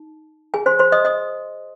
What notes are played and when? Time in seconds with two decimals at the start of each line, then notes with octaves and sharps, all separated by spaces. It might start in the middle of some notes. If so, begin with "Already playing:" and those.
Already playing: D#4
0.54 G#4 G#5
0.66 C5 C6
0.79 C5 C6
0.92 D#5 D#6
1.05 D#5 D#6